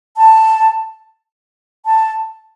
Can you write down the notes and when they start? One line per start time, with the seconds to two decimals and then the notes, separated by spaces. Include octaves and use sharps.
0.17 A5
1.86 A5